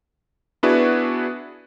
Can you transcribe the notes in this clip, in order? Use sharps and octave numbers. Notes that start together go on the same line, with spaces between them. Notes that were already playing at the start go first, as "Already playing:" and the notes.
B3 D4 E4 F#4 G#4 B4